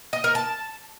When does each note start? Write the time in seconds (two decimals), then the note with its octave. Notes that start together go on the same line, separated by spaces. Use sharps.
0.13 D#5
0.24 A#4
0.35 A5